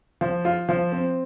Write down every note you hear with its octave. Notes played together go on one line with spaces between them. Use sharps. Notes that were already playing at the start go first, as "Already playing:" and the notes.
F3
F4
F3
C4